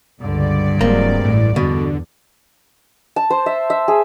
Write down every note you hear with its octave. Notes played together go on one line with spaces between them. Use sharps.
C#2 G2 D3 D5
D1 F#3 G#3 A#3 C4
A1 A2
E2 B2 D3
A5
C5
E5
E5
G#4